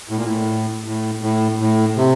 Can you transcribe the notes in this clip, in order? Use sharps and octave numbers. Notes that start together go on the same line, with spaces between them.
A2
A#2
A2
A2
A2
A2
C3